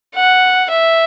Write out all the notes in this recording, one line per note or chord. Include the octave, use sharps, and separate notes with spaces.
F#5
E5